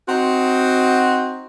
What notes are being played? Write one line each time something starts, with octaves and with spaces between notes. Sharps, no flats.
C4 D#4 F#4